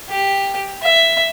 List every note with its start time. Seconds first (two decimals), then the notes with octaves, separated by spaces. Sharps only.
0.10 G4
0.83 E5